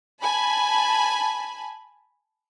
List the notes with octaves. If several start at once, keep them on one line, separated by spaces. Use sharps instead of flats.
G#5 A5 B5